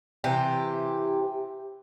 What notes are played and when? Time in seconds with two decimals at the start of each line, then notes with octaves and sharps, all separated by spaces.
0.24 C3 E3 G4